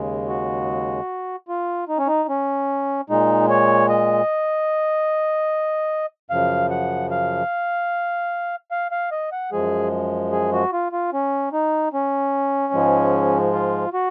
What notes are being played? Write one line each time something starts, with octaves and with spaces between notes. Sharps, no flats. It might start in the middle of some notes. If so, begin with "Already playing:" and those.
Already playing: D#2 C#3 G#3
F#4
F4
D#4
C#4
D#4
C#4
A#2 G#3 D#4
C#5
D#5
F#2 C#3 F3 F5
F#5
F5
F5
F5
D#5
F#5
F#2 F3 G#3 G#4
G#4
F#4
F4
F4
C#4
D#4
C#4
G#2 F3 G#3
F4
F#4